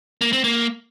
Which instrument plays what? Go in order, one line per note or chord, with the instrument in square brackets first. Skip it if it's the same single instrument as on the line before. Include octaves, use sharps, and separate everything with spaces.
[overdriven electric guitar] A#3
C4
A#3